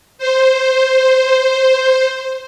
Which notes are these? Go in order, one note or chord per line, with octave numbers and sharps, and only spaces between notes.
C5